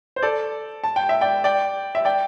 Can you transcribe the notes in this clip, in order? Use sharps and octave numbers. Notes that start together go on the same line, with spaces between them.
C5
A4 D5
A5
G5
E5
D5 G5
D5 G5
E5
D5 G5